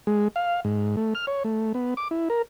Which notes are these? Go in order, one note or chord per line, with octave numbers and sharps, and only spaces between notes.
G#3
F5
G#2
A3
F6
C#5
A3
B3
D6
E4
A#4